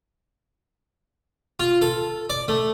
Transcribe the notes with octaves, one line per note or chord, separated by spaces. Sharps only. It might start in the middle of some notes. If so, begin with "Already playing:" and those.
F4
A4
D5
A3